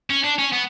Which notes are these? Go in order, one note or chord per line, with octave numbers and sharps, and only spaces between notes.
C#4
D4
C#4
B3